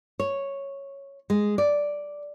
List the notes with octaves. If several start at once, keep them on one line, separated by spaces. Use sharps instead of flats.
C#5
G#3
D5